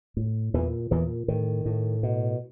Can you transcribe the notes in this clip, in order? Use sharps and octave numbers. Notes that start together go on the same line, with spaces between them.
A2
E2 A#2 E3
E2 A#2 E3
A2 D#3
A2
B2